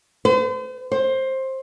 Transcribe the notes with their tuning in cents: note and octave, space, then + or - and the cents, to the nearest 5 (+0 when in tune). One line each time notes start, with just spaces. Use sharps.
C5 -40
C5 +15